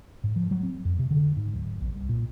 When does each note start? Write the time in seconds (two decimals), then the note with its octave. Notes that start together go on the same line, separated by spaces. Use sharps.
0.24 G#2
0.36 F3
0.51 F#3
0.63 C4
0.85 F2
0.99 C3
1.11 D3
1.37 G#2
1.54 D1
1.81 A#1
1.95 C2
2.09 A#2